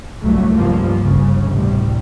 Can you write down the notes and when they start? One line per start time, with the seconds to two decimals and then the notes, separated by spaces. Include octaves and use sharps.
0.22 G1 C2 F#3 A3
0.55 C#2 G2 F3 A#3
1.02 G1 C#2 C#3
1.51 A1 D2 A2 C3 G3